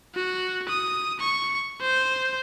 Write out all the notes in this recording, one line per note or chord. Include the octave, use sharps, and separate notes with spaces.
F#4
D#6
C#6
C5